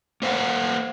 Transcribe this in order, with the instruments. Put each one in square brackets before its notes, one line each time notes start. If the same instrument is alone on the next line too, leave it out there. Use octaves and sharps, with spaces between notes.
[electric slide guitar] A#3 C5 F5 F#5